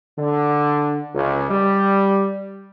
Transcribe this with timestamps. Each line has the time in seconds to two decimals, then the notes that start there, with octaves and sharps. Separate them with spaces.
0.18 D3
1.15 C#2
1.49 G3